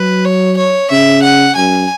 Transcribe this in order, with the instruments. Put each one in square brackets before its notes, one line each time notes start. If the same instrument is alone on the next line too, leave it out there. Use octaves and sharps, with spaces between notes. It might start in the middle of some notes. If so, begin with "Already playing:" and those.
Already playing: [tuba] F#3 [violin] B4
[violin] C#5
C#5
[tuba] C#3 [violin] E5
[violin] F#5
[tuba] F#2 [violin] G#5